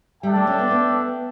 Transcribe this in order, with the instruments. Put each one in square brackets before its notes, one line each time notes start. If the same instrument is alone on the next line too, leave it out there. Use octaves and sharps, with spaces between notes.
[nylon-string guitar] G3 [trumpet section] D4 A4 E5 G5
[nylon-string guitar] A3
C#4
B3
B3